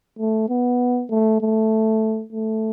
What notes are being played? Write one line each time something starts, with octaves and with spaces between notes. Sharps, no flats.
A3
B3
A3
A3
A3